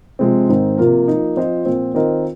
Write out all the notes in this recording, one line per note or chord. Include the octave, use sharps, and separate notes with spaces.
C3 F3 G#3 C4
G#2 D#3 C4 D#4
C3 F3 A#3 F4 A#4
F3 A#3 D#4
F3 C4 F4 C5 D#5
A#2 F3 C4
D#3 C4 F4 A#4 D#5